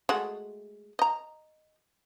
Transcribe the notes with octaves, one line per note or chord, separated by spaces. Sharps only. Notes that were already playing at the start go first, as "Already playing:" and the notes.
G#3 A3 F#4
D#5 A#5